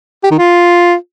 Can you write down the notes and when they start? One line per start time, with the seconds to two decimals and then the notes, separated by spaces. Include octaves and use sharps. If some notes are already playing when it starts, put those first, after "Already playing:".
0.24 G4
0.31 D#3
0.38 F4